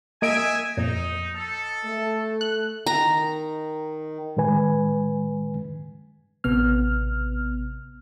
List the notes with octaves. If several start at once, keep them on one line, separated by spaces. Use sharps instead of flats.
A#3 D#5 E5 G#5 D7
F2 A#2 D#4
A4
A3
F#6
D#3 A#5
A2 D#3 G#3 B4 G#5
A1 C3 B3 F6